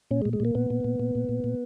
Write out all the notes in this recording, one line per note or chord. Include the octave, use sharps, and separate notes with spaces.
A#2 C#4
G#3
A#2
G#3
A#2 A#3
A#2 B3
A#2
A#2
A#2
A#2
A#2
A#2